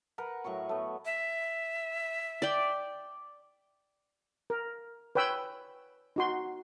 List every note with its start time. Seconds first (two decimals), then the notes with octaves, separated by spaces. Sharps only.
0.18 A#4 B4 F#5
0.44 A2 F#3 C#5 C#6
0.69 A3 B3
1.05 E5
2.42 D5 G5
4.50 A#4
5.15 B4 C#5 G5 B5 E6
6.16 D#4 F#4 C6